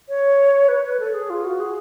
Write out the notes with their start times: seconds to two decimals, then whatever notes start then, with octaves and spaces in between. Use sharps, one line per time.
0.09 C#5
0.69 B4
0.84 B4
1.00 A4
1.14 G#4
1.30 F4
1.45 F#4
1.60 G#4